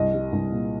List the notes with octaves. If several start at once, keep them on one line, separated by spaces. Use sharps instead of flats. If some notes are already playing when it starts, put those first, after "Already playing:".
Already playing: C2 D#5
G3
C2
A#2